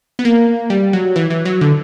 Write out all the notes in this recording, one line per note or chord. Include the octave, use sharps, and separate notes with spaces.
B3
A#3
G3
F#3
E3
E3
F#3
D3